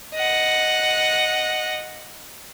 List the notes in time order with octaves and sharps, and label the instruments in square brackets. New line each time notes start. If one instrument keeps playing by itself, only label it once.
[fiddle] D#5 F#5